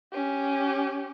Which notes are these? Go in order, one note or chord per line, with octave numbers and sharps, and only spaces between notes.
C#4 G4